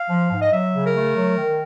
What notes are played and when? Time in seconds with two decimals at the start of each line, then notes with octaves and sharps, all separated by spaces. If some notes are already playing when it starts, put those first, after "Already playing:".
Already playing: F5
0.09 F3
0.31 G#2
0.41 D#5
0.52 F#3 E5
0.73 C#3
0.84 A#4
0.94 A3
1.15 F#3
1.36 D#3